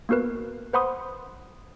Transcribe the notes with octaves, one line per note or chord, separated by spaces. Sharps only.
A#3 B3 F#4 A#4 B4
B4 C5 F#5 B5 C6 D#6